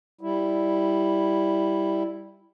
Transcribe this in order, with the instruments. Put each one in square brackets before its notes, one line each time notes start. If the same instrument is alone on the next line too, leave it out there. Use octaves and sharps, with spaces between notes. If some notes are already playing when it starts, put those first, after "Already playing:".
[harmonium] G3 E4